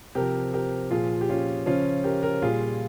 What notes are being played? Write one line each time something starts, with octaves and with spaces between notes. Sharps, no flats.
C3 F3 G4 A#4
G4 A#4
A#2 F3 F4 G#4
G4
C#4 F4
C#3 F3 C#4 F4
G4 A#4
G4 A#4
A#2 G3 F4 G#4